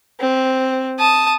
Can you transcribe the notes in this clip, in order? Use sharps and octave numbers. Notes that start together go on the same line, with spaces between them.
C4
A5 D#6